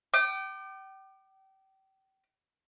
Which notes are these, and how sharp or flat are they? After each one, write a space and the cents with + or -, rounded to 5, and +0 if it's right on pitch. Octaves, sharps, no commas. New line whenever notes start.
G5 -30 D6 +30